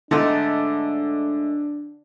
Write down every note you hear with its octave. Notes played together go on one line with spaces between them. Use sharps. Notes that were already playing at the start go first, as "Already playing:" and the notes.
G#2 D3 A3 D4 D#5